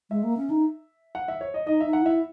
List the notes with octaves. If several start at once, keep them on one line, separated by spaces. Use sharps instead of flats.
G#3 E5
A#3
C#4
D#4
F#5
E5
C#5
D#5
D#4 D#5
D#4 E5
F#5
E4 E5